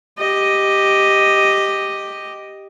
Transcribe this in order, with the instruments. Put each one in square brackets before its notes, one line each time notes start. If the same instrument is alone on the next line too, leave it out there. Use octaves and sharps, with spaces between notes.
[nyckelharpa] G4 D#5